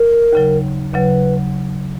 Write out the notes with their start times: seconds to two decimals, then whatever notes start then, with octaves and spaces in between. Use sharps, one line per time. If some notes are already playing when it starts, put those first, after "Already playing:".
Already playing: A#4
0.33 D#2 C#3 F#3
0.93 D#2 C#3 F#3 B4